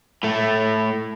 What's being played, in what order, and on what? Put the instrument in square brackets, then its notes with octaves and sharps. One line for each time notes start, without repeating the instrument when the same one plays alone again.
[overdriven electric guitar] A2 A3